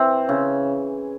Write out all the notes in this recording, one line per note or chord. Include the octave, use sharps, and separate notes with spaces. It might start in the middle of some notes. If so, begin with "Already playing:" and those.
Already playing: E3 C4
C#3